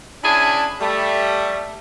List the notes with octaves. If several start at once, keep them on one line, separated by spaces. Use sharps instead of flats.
C#4 D4 E4 G#4 G#5 A5
G3 A3